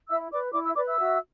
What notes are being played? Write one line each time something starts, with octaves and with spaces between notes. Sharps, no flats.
E4 E5 E6
B4 D5 D6
E4 D5 D6
E5 E6
B4 D5 D6
E5 E6
F#4